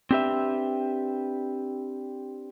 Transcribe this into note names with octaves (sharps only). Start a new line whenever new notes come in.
C4 D4 G4 B4 E5